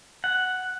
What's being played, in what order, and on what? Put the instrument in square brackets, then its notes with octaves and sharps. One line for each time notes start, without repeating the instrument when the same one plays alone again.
[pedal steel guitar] F#5